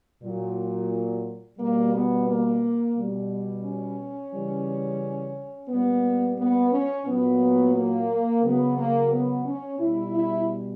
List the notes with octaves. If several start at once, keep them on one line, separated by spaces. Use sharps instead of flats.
A#2 F#3
B2 G3 A#3
B3
A#3
B2 G3
C#4
C#3 E3 G3
A#2 G3 B3
B3
C#4
A#2 F#3 B3
A#3
C#3 F#3 B3
A#3
B3
C#4
B2 G3 E4
E4